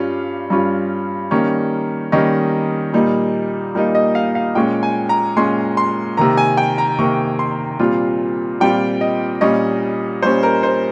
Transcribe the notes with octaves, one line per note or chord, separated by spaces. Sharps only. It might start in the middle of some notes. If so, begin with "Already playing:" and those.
Already playing: G2 G3 C#4 F4 F5
G2 G3 C#4 F4
D#3 G3 A#3 C#4
D#3 G3 A#3 C#4 D#5
A#2 G3 A#3 D#4
A#2 G3 A#3 D#4
D#5
F5
F5
A#2 G#3 C#4 G5
G#5
A#5
A#2 G#3 C#4 C6
C6
C3 D#3 A#3 A#5
G#5
G5
A#5
C3 D#3 A#3 C#6
C6
A#2 G3 C4 F4
A#2 G3 C4 F4 G5
D#5
A#2 G3 C#4 D#5
A#2 G3 C#4 C5
A#4
C5